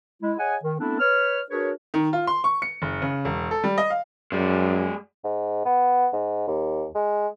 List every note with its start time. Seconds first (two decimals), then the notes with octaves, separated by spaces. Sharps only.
0.23 G#3 E4
0.38 G#4 C#5 D#5 F#5 G#5
0.64 D#3
0.80 A3 B3 C4 D4 E4 A4
1.00 B4 C#5 F6
1.50 D4 F#4 G#4 A#4 B4 C#5
1.94 D#3
2.13 F4
2.27 C6
2.44 C#6
2.62 C#7
2.82 F#1
3.02 C#3
3.25 E1
3.51 A4
3.64 G3
3.78 D#5
3.90 F5
4.32 F#2 G#3 D5
5.24 G#2
5.65 B3
6.13 G#2
6.48 D#2
6.95 G#3